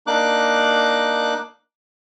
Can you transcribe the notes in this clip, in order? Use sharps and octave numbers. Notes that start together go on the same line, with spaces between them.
A#3 D4 D#4 D6 F#6